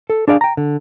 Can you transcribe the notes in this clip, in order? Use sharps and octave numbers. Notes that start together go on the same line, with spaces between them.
A4
D4 G#4 D5 F5
G5 A#5
D3